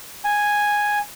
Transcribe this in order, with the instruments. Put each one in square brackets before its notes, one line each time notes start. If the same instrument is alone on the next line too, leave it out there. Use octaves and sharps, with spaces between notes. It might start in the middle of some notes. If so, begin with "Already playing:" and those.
[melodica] G#5